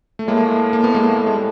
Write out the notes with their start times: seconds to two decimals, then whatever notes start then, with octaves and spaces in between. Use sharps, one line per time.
0.19 A3
0.28 A2 G#3 A#3
0.73 A#3
0.84 B3
0.95 G#3 A#3
1.19 A3
1.26 G#3
1.35 G3